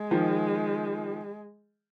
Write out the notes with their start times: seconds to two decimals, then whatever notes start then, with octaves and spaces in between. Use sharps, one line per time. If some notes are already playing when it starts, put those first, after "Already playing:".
Already playing: G#3
0.11 D#3 F3